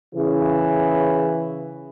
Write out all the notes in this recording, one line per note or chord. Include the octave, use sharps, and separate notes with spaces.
C#3 E3